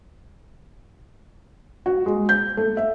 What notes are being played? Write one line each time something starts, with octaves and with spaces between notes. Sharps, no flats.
F#4
G#3
G6
A3
E5